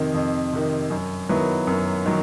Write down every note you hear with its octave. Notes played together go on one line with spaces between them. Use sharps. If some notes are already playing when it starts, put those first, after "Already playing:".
Already playing: F2 C3 D#3
F2
C3 D#3
F#2
D#3 F#3 B3 E4
F#2
D#3 F#3